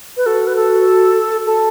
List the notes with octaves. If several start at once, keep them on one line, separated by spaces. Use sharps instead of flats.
B4
F#4 A4
B4
A4
A4 A5